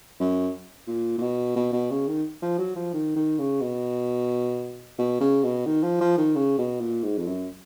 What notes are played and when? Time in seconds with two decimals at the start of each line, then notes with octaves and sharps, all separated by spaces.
0.20 F#2
0.87 A#2
1.18 A#2
1.22 B2
1.56 B2
1.73 B2
1.91 C#3
2.07 D#3
2.42 F3
2.58 F#3
2.76 F3
2.93 D#3
3.16 D#3
3.39 C#3
3.61 B2
4.99 B2
5.21 C#3
5.44 B2
5.66 D#3
5.83 F3
6.01 F3
6.17 D#3
6.35 C#3
6.58 B2
6.80 A#2
7.03 G#2
7.17 F2
7.27 F#2